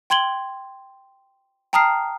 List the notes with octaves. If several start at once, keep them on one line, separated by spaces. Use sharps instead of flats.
G5 C6 G#6 F#7 G7
G5 A5 A#5 D#6 F6 C7